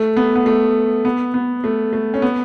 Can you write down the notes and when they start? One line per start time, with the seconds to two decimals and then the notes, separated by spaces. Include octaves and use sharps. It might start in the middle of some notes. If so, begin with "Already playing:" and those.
Already playing: A3
0.17 B3
0.36 B3
0.46 A3
1.05 B3
1.34 B3
1.64 A3
1.93 A3
2.14 C#4
2.22 B3